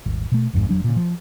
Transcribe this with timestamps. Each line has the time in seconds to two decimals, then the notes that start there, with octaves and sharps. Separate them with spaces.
0.06 D#1 G#1
0.32 B2 A3
0.53 A#1 F2 G#2
0.69 F1 E2 F#3 D4
0.84 A#2 C#3
0.96 F3